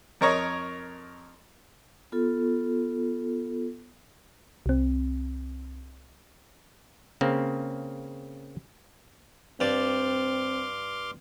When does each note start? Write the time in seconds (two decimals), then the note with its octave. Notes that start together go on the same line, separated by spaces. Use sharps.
0.21 F2 A#4 C#5 D#5
2.12 B3 F4 A4
4.66 C2 C4
7.21 C#3 A#3 C4
9.60 G2 C4 D5 C6 D6 F6